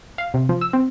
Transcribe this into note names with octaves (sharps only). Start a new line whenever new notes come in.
F5
C3
F3
E6
C4